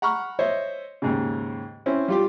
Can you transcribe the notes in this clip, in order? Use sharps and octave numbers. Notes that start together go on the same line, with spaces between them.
F#5 A#5 B5 C#6 F6
C5 C#5 D#5 E5
D#2 G#2 C#3
C4 C#4 E4
G3 F4 G4